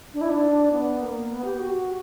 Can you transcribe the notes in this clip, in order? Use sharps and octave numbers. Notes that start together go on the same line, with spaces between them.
D4
E4
D4
B3
A#3
B3
G4
F#4